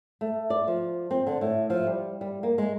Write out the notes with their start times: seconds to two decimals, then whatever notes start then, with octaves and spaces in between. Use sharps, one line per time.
0.21 A3
0.50 D5
0.68 F3
1.11 C4
1.27 D3
1.41 A2
1.70 F3
1.87 G3
2.21 G3
2.43 A#3
2.58 G#3